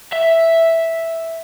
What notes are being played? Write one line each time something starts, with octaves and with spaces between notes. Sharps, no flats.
E5